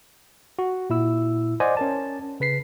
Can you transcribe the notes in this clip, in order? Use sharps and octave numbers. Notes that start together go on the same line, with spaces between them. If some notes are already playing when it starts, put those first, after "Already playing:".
F#4
A#2 E4 E6
C5 D5 D#5 F#5 G#5
C#4 A#4 A5
C#3 B4 B6 C7